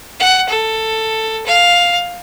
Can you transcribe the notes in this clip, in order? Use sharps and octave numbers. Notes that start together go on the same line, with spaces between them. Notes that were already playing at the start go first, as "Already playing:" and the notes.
F#5
A4
F5